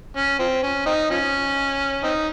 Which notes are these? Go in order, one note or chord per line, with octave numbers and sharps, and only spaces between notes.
C#4
F3 C4
C#4
C4 D#4
F3 C#4
C4 D#4